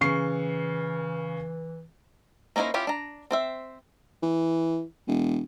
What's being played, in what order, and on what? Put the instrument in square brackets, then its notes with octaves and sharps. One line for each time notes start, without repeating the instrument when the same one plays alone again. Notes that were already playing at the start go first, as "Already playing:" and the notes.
[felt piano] C#3 C#6 C7 [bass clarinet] E3
[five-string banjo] A#3 C#4 D#4 E4 C5
C#4 E4 F4 G4
D4 A#5
C4 C5 E5
[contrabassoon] E3
E1